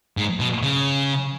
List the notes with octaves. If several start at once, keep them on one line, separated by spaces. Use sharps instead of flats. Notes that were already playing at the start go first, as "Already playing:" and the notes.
G#2
B2
C#3